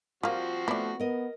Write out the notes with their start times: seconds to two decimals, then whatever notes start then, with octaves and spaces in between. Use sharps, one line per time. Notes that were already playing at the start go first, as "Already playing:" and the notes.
0.23 F3 G3 A#3 C4 F4 F#4
0.68 A3 B3 E4 D5
1.00 B3 A#4 D#5